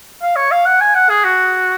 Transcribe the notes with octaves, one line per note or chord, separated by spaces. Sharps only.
F5
C#5
F5
F#5
G#5
F#5
G#4
F#4